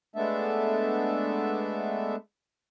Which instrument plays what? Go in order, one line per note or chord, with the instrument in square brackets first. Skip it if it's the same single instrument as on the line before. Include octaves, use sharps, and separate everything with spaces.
[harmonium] G#3 A3 B3 D4 A4 E5